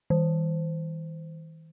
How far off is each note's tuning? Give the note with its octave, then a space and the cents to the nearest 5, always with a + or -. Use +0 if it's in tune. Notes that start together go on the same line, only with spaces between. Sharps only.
E3 -45